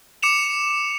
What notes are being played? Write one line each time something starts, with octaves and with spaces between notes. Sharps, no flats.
D6 C#7 E7 F7